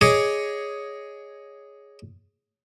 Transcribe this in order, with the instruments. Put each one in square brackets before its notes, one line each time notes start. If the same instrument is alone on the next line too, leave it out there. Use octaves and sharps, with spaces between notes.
[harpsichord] G#4 C#5 D#5 D6